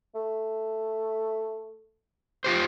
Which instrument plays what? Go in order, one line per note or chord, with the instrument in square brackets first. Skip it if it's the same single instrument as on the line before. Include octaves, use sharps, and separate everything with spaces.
[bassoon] A3
[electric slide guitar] F4 G4 C5